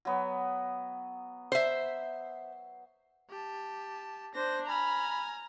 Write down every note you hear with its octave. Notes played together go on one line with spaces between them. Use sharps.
F#3 B3
C5 E5
G4 A5
D4 C5 A#6
G#5 A#5 B5 F6